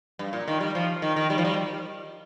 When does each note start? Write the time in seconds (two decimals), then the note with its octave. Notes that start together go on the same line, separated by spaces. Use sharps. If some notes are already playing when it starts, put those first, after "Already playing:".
0.19 G2
0.33 A#2
0.48 D#3
0.60 G3
0.75 F3
1.02 D#3
1.16 D#3
1.30 G3
1.38 F3
1.45 G3